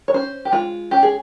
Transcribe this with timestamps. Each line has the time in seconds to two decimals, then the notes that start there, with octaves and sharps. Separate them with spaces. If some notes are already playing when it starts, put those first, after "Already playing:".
0.08 C#5
0.14 C#4 C5
0.45 G4
0.52 G#3 F4
0.91 C#4 G4
1.03 G#4